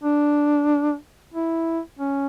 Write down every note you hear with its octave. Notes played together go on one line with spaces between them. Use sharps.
D4
E4
C#4